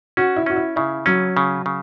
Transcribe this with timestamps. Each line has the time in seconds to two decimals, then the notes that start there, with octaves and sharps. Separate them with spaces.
0.17 C#4 F#4
0.36 E4
0.46 C#4 F#4
0.56 E4
0.76 C#3 E4
1.06 F#3 C#4
1.37 C#3
1.66 C#3